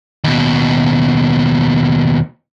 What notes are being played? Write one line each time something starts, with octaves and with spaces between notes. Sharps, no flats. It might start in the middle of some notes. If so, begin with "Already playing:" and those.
D#2 B2